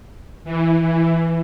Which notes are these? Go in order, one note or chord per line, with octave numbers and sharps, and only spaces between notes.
E3
E3